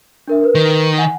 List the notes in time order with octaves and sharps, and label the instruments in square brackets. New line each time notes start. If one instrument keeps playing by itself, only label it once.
[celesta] D4 A#4 E5
A#4 B4
[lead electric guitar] D#3
[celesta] F#5 G#5